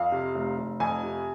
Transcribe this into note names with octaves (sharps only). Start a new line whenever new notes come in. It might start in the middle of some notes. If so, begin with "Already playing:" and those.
Already playing: F2 F5
C3
F1
F1
F2 G#5
C3